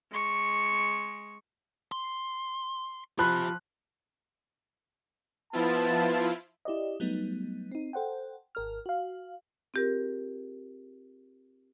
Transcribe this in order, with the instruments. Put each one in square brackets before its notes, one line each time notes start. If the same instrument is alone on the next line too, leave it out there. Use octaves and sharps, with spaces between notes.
[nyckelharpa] G#3 C#6
[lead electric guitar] C6
[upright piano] F3 B5 F#6 [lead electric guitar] G4 C5
[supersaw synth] F3 E4 F4 [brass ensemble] B3 A5
[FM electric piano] E4 G4 D5 D#5
F#3 G3 A3 B3 D#4
C4 D#4
A4 C5 F#5 G5
G#1 A#4 F6
F#4 F5
[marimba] C4 F4 G4 G#4 A#4